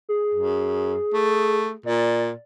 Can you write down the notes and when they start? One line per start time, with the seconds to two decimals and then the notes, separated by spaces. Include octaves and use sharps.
0.09 G#4
0.34 F#2
1.14 A3
1.86 A#2 D5